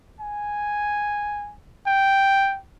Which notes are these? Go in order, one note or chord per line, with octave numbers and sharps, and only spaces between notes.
G#5
G5